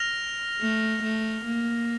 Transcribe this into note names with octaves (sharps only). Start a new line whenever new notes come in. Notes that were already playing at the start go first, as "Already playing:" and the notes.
Already playing: F6 A#6 F7
A3
A3
A#3